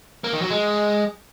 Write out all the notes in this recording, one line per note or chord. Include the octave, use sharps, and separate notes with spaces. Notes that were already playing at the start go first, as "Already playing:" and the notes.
A#3
D#3
F#3
G#3